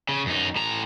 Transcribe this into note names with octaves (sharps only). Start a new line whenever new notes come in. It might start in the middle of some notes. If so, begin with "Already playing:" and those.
C#3
F#2 D#4
A2 A#5